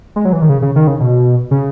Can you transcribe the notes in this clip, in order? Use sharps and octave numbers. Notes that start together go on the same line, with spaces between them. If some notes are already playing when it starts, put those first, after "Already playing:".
G#3
F#3
E3
D#3
C#3
C#3
D#3
C#3
B2
C#3